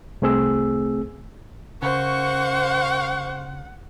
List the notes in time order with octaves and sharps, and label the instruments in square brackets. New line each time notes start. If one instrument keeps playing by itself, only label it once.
[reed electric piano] C2 A3 C4 G#4 E6
[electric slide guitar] C#3 [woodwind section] A#4 F5 C#6 [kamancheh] C5 [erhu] F#5